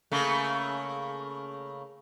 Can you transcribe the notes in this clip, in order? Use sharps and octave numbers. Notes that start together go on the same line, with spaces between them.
C#3 A3 A#3